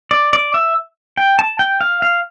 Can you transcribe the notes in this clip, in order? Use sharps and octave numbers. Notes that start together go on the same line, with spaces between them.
D5
D5
E5
G5
A5
G5
F5
F5